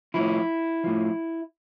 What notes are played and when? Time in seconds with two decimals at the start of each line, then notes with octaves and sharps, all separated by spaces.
0.14 A2 F3 E4
0.84 A2 F3